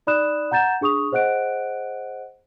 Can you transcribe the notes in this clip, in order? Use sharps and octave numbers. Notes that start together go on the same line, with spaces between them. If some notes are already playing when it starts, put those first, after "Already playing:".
D#4 D5 B5 D#6 F#6 E7
F#5 A#5 G6 A6 E7
D4 G#4 C#6 D#6 F7
G#4 C5 D#5 F#5 F#6 D7